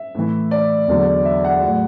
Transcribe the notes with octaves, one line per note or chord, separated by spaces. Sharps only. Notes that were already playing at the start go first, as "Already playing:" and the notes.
Already playing: E5
A2 E3
D5
E2 D3 F#3
E5
F#5
A2 F#3